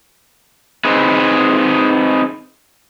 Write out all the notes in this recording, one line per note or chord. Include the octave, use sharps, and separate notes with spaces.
C4 D#4 G#4 B4